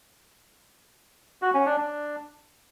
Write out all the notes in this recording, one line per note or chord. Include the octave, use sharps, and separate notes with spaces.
F#4
C#4
D4
D4